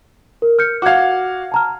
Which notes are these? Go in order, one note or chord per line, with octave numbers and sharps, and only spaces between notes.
A#4
F6 G6 C#7
F#4 F5 D6 G#6
A5 A#5 F6